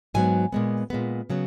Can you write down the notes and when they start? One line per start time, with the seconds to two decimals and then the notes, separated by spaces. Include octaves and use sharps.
0.14 G#2 F#3 B3 G#5
0.52 A#2 G#3 B3
0.90 A#2 G#3 B3
1.30 C#3 F#3 B3